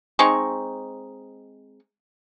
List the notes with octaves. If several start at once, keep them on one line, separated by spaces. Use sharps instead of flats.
G#3 C4 D#4 C#6